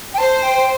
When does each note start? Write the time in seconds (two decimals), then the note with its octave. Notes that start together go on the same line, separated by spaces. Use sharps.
0.14 G5
0.18 C5 A5
0.43 G5